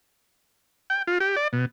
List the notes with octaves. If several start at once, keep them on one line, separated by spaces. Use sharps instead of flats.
G5
F4
G4
D5
B2